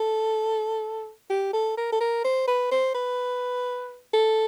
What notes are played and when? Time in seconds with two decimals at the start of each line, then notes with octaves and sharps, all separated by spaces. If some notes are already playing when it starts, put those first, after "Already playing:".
Already playing: A4
1.30 G4
1.53 A4
1.77 A#4
1.92 A4
2.01 A#4
2.25 C5
2.48 B4
2.72 C5
2.94 B4
4.13 A4